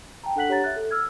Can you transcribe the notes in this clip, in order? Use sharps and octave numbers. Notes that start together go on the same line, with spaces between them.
G5 A5 A#5
D4 A4 F#5 F#6 B6 F#7
D4 G4 C#5 F#5 A#5 A6
E5 F#6 A6
A4
E6 F6 G#6